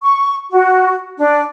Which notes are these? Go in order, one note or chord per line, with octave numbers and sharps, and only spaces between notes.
C#6
F#4
D4